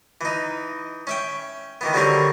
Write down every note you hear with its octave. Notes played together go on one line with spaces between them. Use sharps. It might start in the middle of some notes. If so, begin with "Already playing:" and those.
E3 D#4
C#4 E5 G5
D#3 E3 B3
D3 F#3 G3 C4 C#4 A#4